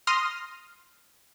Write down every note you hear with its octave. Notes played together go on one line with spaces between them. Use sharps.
C6 D#6 F6 A#6